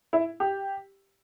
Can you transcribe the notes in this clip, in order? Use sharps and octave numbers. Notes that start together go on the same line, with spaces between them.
E4
G4